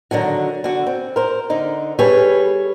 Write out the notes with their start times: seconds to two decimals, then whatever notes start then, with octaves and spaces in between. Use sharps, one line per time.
0.11 D3 D#3 F#3 F#4
0.64 D3 F#4
0.87 C4
1.16 A#4 C5
1.50 D3 D#4
1.99 G3 G#4 A4 B4 C#5